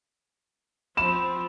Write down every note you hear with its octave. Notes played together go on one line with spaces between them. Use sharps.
F3 C4 B5 E7